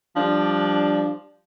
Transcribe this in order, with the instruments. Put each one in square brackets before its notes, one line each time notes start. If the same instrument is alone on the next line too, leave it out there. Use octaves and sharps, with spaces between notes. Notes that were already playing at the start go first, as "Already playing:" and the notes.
[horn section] F3 G3 D4